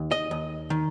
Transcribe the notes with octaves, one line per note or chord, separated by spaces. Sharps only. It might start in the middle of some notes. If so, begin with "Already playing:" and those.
Already playing: D#2
D#5
D#2
D#3